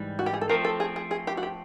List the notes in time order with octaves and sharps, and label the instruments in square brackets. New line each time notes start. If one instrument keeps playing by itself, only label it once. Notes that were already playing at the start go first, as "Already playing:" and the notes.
Already playing: [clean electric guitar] G#2 E3 G3
[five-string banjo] F#4
G4
G#4
A4
[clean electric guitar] F3 A3 C4 [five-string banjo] A#4
[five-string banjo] A4
G#4
G#4
G#4
G4
F#4
G4